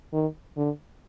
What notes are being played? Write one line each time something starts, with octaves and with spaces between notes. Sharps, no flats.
D#3
D3